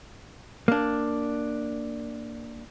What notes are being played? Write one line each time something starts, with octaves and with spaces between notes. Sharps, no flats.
A#3 D4